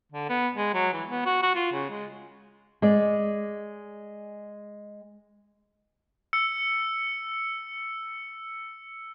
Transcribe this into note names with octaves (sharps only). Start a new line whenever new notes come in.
D3
B3
G#3
F#3
E3
B3
F#4
F#4
F4
C#3
G#3
G#3 D5
E6 C#7